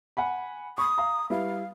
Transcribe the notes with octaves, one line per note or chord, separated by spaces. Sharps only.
F#5 G#5 B5
B5 C#6 D#6
F5 A#5
G3 E4 B4 F5